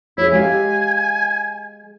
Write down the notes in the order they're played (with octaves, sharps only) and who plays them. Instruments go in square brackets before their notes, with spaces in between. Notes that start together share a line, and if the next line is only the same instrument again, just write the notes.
[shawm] E4 [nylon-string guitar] G#4 C#5
[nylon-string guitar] G#3 G4 F5 [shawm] G#5